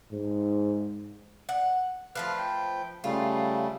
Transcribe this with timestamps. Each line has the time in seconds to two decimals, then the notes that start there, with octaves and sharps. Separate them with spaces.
0.12 G#2
1.49 F#5
2.15 F3 A3 B4 F5 F6 F#6
2.39 G5
3.04 C#3 G3 A3 F4